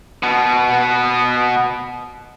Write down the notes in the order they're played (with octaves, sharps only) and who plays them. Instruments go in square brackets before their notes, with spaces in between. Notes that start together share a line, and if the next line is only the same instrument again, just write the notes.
[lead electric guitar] B2 B3